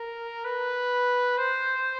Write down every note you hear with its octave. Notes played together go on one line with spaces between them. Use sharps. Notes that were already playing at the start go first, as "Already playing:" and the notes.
Already playing: A#4
B4
C5